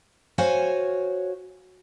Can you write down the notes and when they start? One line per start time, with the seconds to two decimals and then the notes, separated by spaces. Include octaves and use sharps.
0.38 F#4 C5 C#5 F5 G#5